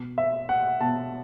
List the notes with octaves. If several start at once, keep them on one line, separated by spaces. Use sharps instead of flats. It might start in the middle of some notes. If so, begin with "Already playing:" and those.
Already playing: B2
E5
F#5
B2 A5